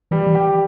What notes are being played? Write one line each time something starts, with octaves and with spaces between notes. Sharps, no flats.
E3 G3
E3
G4